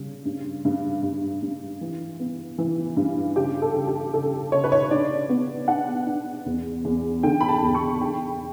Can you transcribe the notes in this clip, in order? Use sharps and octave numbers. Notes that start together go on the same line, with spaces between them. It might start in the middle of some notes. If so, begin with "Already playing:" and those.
Already playing: C#3 G3
G2
G2
G2
G2
E3
B3
E3
G2
C#3 G4
A4
C#3
G4
C#3 A4
C#3 C#5
B4
C#5
D4 D5
B3
D4 F#5
D4
E2
E2
D3 G5
B5
A5
E2
C#6
D4 G5